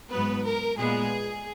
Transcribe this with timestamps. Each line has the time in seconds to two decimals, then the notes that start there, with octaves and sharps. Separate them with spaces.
0.11 G#2 F#3 B3 B4
0.44 A#4
0.78 A#2 G#3 B3 G#4